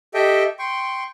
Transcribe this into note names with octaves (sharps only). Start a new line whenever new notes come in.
G4 A4 D#5 E5 G5
G5 C6 C#6